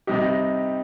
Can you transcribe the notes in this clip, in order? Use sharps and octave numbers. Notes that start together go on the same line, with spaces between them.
C3 G3 D#4 G4